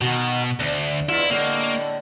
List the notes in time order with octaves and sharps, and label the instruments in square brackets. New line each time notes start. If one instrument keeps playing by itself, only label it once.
[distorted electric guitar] B2 [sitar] D#3 F#4
[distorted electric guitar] D2 [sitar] D4
[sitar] E2 F4 E5 [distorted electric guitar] E4
[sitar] A2 D3 G#3 [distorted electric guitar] A#3